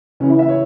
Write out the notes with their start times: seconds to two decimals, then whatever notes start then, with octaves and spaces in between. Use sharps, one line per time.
0.20 C#2 C#3 E3 C#4
0.30 E4
0.39 E5
0.49 C#5